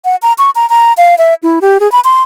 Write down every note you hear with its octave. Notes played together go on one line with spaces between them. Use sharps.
F#5
A#5
C#6
A#5
A#5
F5
E5
E4
G4
G#4
B5
C6